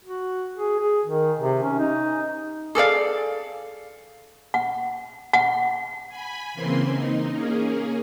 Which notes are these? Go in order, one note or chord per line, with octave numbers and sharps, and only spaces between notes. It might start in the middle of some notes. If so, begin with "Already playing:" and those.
F#4
G#4
G#4
D#3
C3
C#4
D#4
G#4 A4 D5 F5
F#5
F#5
G#5 B5
C#3 E3 A#3 C4 C6
D#4
A#3 C#4 G#4